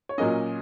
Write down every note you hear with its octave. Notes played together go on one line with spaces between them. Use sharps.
C#5
A#2 F#3 A#3 C#4 D#5